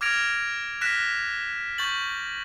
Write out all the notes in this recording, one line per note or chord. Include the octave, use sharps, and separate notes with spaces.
D6 F6 G#6 A#6 D7 F7
F6 F#6 A#6 B6 E7
C#6 G6 A6 F#7